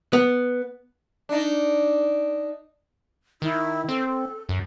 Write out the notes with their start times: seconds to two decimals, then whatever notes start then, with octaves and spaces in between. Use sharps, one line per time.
0.13 B3
1.29 D4 D#4
3.42 D#3 E4
3.89 C4 A4
4.49 F#2